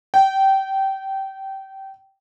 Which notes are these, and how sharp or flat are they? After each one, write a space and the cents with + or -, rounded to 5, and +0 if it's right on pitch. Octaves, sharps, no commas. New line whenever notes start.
G5 -20